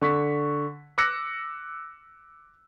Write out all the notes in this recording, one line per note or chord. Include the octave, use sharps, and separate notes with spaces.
D3 C#6 B6
D6 E6 F#6 A#6 C#7